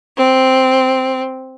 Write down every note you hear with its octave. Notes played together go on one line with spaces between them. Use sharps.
C4